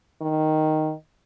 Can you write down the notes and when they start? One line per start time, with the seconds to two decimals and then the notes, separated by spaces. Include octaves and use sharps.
0.21 D#3